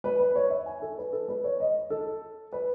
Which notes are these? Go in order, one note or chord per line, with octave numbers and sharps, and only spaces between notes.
B4
B4
C#5
E5
G#5
A4
B4
A4
B4
C#5
D#5
A4
B4